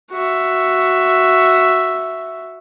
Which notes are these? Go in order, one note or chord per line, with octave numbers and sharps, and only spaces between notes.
F#4 E5